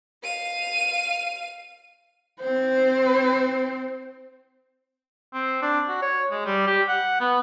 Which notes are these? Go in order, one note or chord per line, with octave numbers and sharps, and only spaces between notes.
F5 D#7
C4 C5
C4
D4
F#4
C#5
G#3
G3
G4
F#5
B3